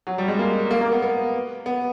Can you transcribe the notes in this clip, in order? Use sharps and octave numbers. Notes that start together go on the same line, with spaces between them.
F#3
G3
G#3
A#3
A#3
A#3
B3
B3
B3